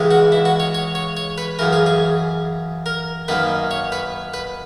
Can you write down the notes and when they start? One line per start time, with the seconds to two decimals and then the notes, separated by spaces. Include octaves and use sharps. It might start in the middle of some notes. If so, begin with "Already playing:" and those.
Already playing: C#2 C#3 E3 G#3
0.11 F#4
0.32 E4
0.45 F#4
0.60 C#5
0.75 C#5
0.95 C#5
1.17 C#5
1.38 B4
1.59 F#2 C#3 E3 A#4
1.73 G#4
1.86 G#4
2.86 A#4
3.28 F#2 D#3 A#3 B4
3.71 C#5
3.92 B4
4.34 B4